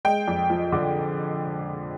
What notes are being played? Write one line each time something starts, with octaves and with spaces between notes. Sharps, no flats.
G#3 G5
F2
F3
D3